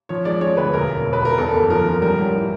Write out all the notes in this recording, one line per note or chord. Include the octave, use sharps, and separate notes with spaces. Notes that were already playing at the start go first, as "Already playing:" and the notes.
F3 C#5
G#3 D5
G#3 C#5
D2 B4
E1 A#4
E1
E1
B4
E1 A#4
E2 A4
F#1
F3 A#4
F3
G3 A#4
A1
E3